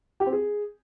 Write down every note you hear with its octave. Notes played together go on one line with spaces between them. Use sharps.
G4
C4
G#4